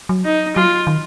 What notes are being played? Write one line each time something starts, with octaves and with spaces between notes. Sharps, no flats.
F#3
D#4
F#3 F4
D#3